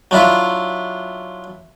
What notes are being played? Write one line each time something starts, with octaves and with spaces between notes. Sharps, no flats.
F#3 D4 E4 F4